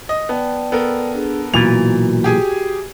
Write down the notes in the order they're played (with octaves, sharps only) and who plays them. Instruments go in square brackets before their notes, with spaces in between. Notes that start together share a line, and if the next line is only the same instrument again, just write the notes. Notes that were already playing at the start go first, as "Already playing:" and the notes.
[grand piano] D#5
[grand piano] B3 [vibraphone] D5 G5 A5
[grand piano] B3 A4 A#4
[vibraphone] D4 G#4
[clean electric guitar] B1 A#2 E3 [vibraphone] F#4 [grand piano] F7
[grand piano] G4 G#4 G#5